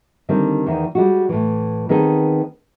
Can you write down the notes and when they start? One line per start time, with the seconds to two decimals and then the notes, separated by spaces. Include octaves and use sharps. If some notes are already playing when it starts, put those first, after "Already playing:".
0.29 D3 D#3 G3 C4
0.66 E2 D#3 E3
0.95 G3 G#3 F#4
1.29 A2 E3
1.89 D#3 B3 C4 G#4 A4